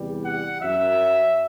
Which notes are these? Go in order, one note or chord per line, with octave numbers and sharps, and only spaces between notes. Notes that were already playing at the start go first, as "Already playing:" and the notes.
Already playing: E2 C3 E3 G3
F#5
F#2 F#3 E5